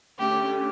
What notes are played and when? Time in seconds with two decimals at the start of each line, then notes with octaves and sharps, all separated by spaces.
0.18 D3 A3 C#4 G4
0.50 D3 A3 C#4